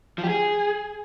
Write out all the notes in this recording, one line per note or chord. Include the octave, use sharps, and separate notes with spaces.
F3
G4
G#4